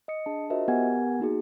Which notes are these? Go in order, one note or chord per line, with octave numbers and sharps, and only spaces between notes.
D#5 D#6 C#7
D4 G#4 A5
F4 F#4 A#4 C5 D#5 E5
B3 G4 A#4 F#5 G#5 G#6
A#3 D#4 F#4 G#4